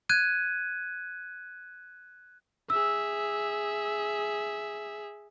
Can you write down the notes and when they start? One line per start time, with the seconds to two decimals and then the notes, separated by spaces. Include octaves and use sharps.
0.09 F#6 G#6 D#7
2.70 G#4 E5 E6